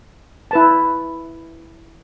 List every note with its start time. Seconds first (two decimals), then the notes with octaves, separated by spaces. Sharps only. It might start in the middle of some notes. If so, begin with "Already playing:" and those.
0.51 E4 B4 A5